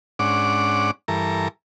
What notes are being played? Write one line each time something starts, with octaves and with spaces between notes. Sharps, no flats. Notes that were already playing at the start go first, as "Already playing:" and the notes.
G#2 C#4 D4 F#5 D6
G2 E3 A4 A#4 A#5